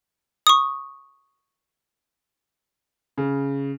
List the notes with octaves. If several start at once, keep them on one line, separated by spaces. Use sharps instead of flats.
C#6 D#6
C#3